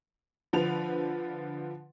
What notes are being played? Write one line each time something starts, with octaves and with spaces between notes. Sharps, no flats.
D3 F3 B4 F7